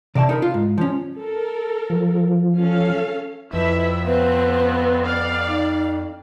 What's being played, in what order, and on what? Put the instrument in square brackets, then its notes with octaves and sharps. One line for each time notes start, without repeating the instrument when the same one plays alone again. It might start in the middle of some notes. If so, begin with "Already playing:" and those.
[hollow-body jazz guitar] C3 D5 F5 A5
D#4 A#4 B5
F4
G#2
F3 C#4
[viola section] A4 A#4
[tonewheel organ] F3
[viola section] C#4 A4 F5
[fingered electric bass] F2 [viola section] E4 E5 [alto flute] B4
[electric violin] B3 [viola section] C4 [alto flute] B4
[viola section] D5 F5
[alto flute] D#4